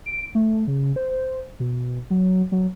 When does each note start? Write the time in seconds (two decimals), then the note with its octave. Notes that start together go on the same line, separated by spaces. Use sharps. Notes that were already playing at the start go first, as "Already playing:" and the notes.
0.06 D7
0.35 A3
0.67 C#3
0.96 C5
1.60 B2
2.10 F#3
2.52 F#3